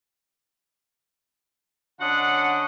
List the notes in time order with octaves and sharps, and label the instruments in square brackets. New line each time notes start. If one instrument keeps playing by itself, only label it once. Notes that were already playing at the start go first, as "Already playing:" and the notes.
[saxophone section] D3 C#4 D#5 F#5